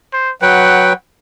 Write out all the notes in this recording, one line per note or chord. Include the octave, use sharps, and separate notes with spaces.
C5
F#3 B4 F#5 G5